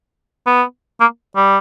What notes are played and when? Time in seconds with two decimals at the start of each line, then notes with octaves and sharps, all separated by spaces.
0.47 B3
1.01 A#3
1.36 G3